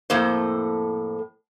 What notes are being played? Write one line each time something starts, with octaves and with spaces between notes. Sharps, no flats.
F2 A2 A#3 A4 C5